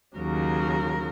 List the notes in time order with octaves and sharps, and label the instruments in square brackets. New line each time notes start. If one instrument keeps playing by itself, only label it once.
[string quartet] D#2 C#3 F#3 A#4